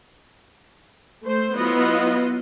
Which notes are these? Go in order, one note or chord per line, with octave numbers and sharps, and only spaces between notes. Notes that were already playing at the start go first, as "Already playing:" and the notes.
A3 C5
F#3 B3 E4 F4 D#5